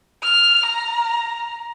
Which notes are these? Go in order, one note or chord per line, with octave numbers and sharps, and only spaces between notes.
F6
A#5